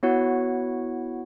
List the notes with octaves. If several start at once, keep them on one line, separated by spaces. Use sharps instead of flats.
B3 E4 F#4 C#5 F#5